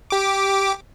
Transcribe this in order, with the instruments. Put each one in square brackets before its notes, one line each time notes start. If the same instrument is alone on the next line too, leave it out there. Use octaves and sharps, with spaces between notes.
[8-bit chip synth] G4 D6